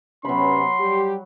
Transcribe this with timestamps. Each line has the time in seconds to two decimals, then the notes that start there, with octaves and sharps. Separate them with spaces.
0.25 C3 F#3 B3 C#4 B5 C6
0.81 G3 G4